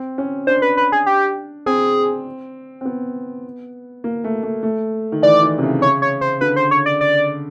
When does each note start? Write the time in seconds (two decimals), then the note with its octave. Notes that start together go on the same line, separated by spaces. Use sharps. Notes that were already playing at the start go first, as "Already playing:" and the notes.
Already playing: C4
0.18 C#4
0.47 D4 C5
0.62 B4
0.77 B4
0.92 G#4
1.06 G4
1.66 C4 G#4
2.81 C4
2.85 B3
4.04 A#3
4.24 A3
4.43 A3
4.63 A3
5.12 D#3
5.22 E3 D5
5.42 D#3
5.58 C3
5.63 C#3
5.82 C#5
6.02 C#5
6.21 C5
6.41 D3 B4
6.56 C5
6.71 C#5
6.86 D5
7.01 D5